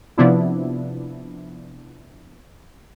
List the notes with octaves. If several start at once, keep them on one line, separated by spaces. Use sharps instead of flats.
C3 F3 B3 D4 E4